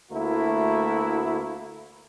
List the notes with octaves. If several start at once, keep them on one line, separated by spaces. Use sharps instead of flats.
D2 A3 A#3 E4 F#4